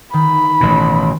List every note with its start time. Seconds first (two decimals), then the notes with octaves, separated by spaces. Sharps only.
0.13 D#3 B5
0.61 A1 B2